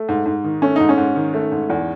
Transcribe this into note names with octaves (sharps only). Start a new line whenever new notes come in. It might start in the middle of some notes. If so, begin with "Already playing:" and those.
Already playing: A3
G#2
G#2
D#3
A3 C#4
G#2 D#4
C#4
G#2
D#3
A3
G#2
E2